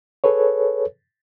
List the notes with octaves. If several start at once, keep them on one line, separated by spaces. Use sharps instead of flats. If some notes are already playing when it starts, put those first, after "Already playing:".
G#4 A4 B4 C#5